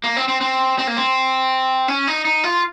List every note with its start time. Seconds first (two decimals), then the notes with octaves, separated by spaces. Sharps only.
0.04 A#3
0.17 C4
0.28 C4
0.41 C4
0.79 C4
0.87 A#3
0.97 C4
1.88 C#4
2.07 D#4
2.25 D#4
2.44 F4